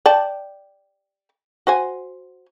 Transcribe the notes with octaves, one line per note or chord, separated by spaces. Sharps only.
D5 G5 A5
F#4 C5 G#5